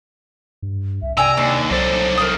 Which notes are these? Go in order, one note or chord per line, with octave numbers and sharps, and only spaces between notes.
G2
C2 E5
C3 D5 G5 G#5 A#5 E6
D#2 D4 A5
C2 F#3 A4 C5
A#4 C5 D#6